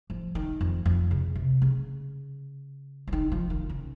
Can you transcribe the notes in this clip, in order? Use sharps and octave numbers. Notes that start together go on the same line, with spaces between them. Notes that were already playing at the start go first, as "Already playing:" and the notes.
F3
D#3
F2
F2
C#3
C3
C#3
F3
D#3
F3
D#3
C#3